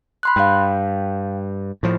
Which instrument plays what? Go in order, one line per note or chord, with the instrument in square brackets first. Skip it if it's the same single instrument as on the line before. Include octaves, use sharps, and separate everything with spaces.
[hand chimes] B5 C6 F#6
[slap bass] G2 [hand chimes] F5 G5
[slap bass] A2 F3